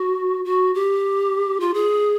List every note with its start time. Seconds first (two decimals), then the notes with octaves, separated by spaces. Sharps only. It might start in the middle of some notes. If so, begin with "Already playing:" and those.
Already playing: F#4
0.45 F#4
0.74 G4
1.60 F4
1.74 G#4